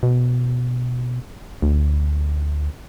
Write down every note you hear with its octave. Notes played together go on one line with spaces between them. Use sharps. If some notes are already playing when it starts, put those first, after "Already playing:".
B2
D2